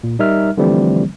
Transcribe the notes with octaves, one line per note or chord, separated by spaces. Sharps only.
A#2
G3 D#4 A#4 E5 F6
D3 E3 F3 G3 A3 C4